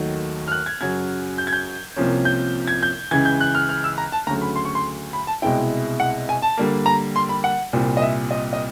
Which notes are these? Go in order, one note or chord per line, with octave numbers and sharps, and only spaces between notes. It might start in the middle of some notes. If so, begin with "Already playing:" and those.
Already playing: D#2 D#3 F#3 A3
F6
F#6
G#6
F#2 C#3 F#3 G#6
G6
G#6
G6
C2 C3 F3 A#3 C#4
G6
G#6
G6
C#2 C#3 E3 G#6
G6
F#6
F6
F6
E6
A#5
A5
D2 C#3 F#3 A3 A#5
B5
C6
C#6
C6
B5
A5
C2 B2 G#3 C4 E4 G5
F#5
G#5
A5
D3 G3 A#3
A#5
C6
B5
F#5
C2 A#2 G3 C4
D#5
E5
D#5
D#5